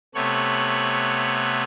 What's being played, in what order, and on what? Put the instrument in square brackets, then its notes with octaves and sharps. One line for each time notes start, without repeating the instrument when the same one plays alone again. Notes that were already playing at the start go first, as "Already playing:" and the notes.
[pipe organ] C3 A3 B3 C#5 F#6